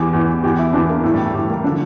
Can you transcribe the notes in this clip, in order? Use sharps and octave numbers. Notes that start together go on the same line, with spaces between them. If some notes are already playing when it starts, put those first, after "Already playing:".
Already playing: E2 E3 G4
E2 E3
E2 E3 G4
E4
E2 E3 D4
A#3
A2 E3 A3
G3
A3
A2 E3 G3
A#3
D3 F3 D4